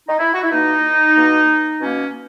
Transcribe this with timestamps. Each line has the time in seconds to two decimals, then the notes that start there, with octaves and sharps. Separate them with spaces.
0.08 D#4
0.19 E4
0.34 F#4
0.43 E4
0.52 B2 A#3 D#4
1.16 B2 A#3
1.81 B2 A#3 C#4